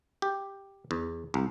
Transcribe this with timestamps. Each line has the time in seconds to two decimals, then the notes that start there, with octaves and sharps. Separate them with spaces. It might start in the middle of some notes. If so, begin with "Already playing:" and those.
0.22 G4
0.91 E2
1.34 C2